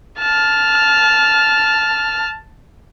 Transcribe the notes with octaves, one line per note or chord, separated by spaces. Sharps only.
A5 F6